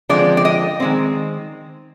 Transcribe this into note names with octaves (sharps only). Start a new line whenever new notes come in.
D3 F3 G#3 C4 D5
D5
D#5
D#3 G#3 C4